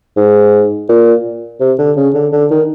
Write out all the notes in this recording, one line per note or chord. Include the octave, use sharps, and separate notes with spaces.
G#2
A#2
C3
D3
C#3
D3
D3
D#3